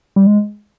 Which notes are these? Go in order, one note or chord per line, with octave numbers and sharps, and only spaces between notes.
G3
G#3